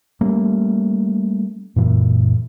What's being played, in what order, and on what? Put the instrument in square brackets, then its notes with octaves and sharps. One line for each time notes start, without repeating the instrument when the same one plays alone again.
[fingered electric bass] G3 A3 A#3 C#4
F#2 A#2 E3